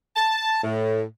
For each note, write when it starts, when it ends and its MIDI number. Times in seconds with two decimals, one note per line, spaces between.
0.16 0.61 81
0.63 1.02 45